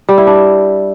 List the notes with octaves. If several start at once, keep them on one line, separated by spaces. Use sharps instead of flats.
G3
E4
D4